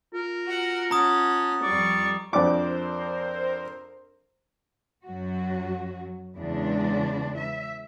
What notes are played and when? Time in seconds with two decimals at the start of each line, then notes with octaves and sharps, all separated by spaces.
0.14 F4 A#4
0.46 F#4 F#5
0.91 C#4 F#5 A5 A#5 D#6
1.63 F2 G3 D5 C#6
2.33 F2 C4 D4 A#4 C5 D6
5.05 F#2 F#3 F#4
6.37 E2 C#3 G#3 D4
7.38 E5